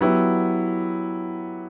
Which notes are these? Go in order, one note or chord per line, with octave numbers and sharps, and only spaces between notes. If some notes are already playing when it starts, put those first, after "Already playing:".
F#3 B3 E4 G4